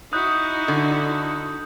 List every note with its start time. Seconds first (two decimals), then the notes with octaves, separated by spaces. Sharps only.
0.13 D#4 E4 F#4 D#6 F#6 G6
0.68 D3